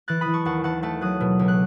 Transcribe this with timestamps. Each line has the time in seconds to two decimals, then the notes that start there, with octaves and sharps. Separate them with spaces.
0.08 E3 F#6 A6
0.21 B5 D#6
0.28 E3
0.34 A5 C#6
0.45 D#2 F#5 A5
0.64 E3 F#5 A5
0.82 A3 F#5 A5
1.01 F#3 D#6 F#6
1.20 B2
1.39 C#2
1.48 F#6